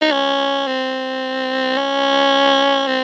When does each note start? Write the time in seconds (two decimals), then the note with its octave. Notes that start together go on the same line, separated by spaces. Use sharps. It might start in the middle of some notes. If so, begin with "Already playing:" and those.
0.01 D#4
0.12 C#4
0.67 C4
1.77 C#4
2.87 C4